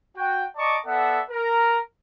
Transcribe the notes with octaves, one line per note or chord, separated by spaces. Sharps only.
F#4 G5
D5 D#5 A5 A#5 C#6 D6
B3 A4 D5 E5 F#5
A#4 A#5